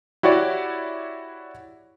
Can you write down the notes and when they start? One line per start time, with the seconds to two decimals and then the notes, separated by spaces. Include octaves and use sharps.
0.23 E4 F#4 G4 C#5 D5